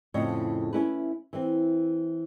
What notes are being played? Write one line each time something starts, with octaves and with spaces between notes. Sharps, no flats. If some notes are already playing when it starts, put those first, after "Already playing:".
F2 A2 C#3 C#5 D#5
C#4 E4 B4
E3 C4